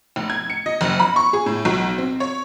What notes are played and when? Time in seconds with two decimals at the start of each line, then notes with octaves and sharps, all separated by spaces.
0.16 F1
0.30 G#6
0.50 C#7
0.66 D#5
0.81 F#1
0.99 B5
1.16 C#6
1.33 G#4
1.46 A2
1.65 B1
1.98 C4
2.20 C#5